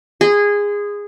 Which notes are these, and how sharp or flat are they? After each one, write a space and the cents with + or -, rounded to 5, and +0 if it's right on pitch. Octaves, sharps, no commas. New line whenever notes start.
G#4 -15 C6 -40